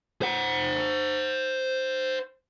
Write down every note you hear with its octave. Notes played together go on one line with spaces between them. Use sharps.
C5 F#5